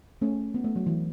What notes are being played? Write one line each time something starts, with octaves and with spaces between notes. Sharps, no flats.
A3 C#4
B3
A3
F#3
E3